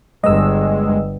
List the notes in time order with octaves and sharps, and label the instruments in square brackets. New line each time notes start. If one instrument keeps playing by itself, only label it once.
[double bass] G1 [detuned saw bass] G#3 [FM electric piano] D#5 E6